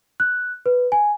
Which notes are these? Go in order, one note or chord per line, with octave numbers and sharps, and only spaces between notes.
F#6
B4
G#5